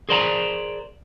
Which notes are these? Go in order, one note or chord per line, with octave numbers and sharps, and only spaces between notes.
G#4 A#4 C5 D5 F#5 A#5